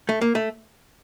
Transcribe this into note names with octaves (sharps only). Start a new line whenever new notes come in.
A3
A#3
A3